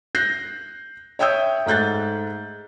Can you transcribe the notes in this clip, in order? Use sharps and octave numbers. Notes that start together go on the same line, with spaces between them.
F#6 G6 A#6 C7
C#5 E5 G5 D#6 E6 G6
G#2 A3 F#6 G6 A6